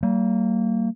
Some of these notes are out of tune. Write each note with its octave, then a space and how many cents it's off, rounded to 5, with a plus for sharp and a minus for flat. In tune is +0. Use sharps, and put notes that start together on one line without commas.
G3 -45 A#3 -25